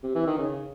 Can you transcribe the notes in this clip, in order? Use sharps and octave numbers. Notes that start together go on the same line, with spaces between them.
C3
E3
D#3
C#3